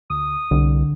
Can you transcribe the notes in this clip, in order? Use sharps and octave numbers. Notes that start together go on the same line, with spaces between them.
D2 D#6
C2 D3